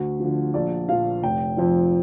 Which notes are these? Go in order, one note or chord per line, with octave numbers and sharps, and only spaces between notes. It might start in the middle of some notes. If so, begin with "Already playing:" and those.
Already playing: D2
D3 F3
A#1 D5
A#2 F3 F5
F1 G5
F2 F3